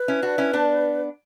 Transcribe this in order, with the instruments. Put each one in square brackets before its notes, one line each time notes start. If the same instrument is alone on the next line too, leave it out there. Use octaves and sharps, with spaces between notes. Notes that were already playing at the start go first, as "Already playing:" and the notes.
Already playing: [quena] B4
[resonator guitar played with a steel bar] C#4 E4
D4 F#4
C#4 E4
B3 D4